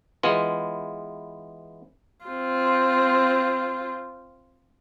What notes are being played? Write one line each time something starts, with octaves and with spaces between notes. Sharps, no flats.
E3 G#3 B3 F4
C4 F4